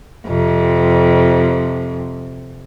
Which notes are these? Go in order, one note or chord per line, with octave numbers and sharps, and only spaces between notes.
F2 C3